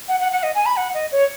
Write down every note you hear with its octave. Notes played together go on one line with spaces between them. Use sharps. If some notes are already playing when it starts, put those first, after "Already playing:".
F#5
F#5
F#5
D#5
G#5
B5
F#5
D#5
C#5